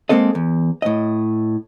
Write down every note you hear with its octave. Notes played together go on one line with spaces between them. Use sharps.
G#3 A#3 C4 A4 D#5
E2
A2 D#5